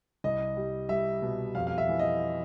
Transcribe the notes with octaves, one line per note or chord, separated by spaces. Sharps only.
C2 D#5
G3
G3 E5
B2
F2 F5
F5
E5
E3
D#5